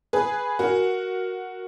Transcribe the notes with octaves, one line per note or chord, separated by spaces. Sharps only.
G#4 B4
F#4 A#4